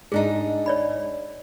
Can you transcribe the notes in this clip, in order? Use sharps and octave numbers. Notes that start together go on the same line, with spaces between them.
G#2 D4 D#4 G#4
C#5 D5 B5